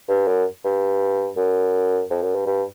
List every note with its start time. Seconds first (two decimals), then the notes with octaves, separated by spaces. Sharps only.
0.09 G2
0.28 F#2
0.65 G2
1.37 F#2
2.10 F2
2.22 F#2
2.35 G2
2.47 G2